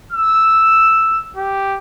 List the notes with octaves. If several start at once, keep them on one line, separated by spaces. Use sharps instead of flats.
E6
G4